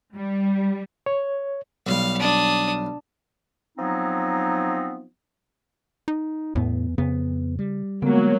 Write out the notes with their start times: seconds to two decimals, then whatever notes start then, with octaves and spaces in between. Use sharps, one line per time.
0.15 G3
1.06 C#5
1.87 B1 G3 F5
2.20 D4 D#6
3.78 F3 F#3 B3 C4 D#4
6.08 D#4
6.55 E2 A2 B3
6.98 F2 C#3 B3
7.59 G3
8.02 D3 F#3 G#3 A#3 B3